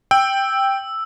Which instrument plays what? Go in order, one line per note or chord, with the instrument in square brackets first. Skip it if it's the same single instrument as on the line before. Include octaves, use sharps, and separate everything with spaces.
[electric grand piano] G5 [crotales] E6